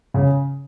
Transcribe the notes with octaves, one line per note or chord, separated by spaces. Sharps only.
C#3